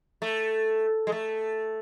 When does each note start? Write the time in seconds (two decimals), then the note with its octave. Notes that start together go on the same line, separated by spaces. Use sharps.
0.22 A3
1.07 G#3
1.12 A3